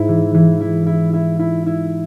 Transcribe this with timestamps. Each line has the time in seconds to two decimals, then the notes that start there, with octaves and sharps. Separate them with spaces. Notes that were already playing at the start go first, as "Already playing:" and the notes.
Already playing: G#2 E4
0.09 E3
0.34 E3
0.60 E4
0.87 E4
1.13 E4
1.39 E4
1.66 E4